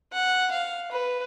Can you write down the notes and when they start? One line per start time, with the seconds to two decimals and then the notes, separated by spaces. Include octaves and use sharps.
0.13 F#5
0.51 F5
0.92 B4